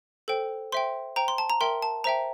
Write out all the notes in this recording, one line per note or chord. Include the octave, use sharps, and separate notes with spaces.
A4 C5 G5
C5 E5 G5 C6
C5 G5 A#5
C6
A5
A#5
A#4 E5 G5 C6
A5
C5 E5 G5 A#5